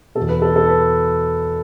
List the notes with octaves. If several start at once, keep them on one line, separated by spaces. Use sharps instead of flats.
B2 A4
E2
B4
A4
A4
B4